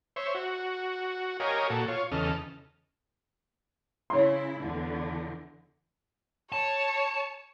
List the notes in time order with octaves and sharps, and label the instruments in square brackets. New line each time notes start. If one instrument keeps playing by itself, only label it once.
[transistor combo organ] C5 C#5 E5
F#4
G4 A#4 C#5 D#5 F5 G#5
A#2 F#4 A4
F4 C#5
E2 C#3 A4 D#5 F6
[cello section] C#3 E4 [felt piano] C#5 C6
[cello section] E2 D3
[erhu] C#5 [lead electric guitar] A5